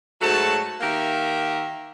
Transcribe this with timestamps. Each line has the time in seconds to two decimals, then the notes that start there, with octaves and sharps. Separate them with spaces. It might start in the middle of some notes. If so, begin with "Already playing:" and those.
0.21 G#2 F#3 A3 F#4 C#5 A5
0.81 D#3 A#3 G4 A#4 E5 A#5